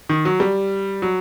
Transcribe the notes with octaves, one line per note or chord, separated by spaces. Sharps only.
D#3
F#3
G3
F#3